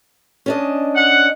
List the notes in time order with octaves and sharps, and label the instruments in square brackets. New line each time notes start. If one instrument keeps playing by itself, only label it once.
[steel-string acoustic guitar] C#4 D4 D#5
[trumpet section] F#5